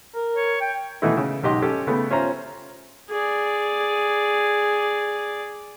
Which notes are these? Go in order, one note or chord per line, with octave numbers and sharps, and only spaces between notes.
A#4
C#5
G5
B2 E3 A3 D#4 E4
C#3
B1 G#2 G4 D#5 C6
C#4 G4 A4 C#5
C#3 A3 B3
C#4 F4 C5 E5 A#5
G#4 D5